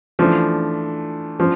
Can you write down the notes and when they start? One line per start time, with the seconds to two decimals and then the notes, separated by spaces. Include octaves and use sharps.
0.19 E3 F3 A3 D4
1.40 F3